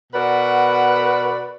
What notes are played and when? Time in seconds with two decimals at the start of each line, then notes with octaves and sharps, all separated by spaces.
0.13 B2 F#4 A#4 B4 D5 F#5